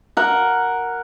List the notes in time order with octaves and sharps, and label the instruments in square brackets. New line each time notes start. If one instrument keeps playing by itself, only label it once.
[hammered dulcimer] A#4 F#5